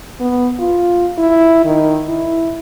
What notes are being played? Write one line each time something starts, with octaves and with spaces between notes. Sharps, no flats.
B3
F4
E4
D#3
E4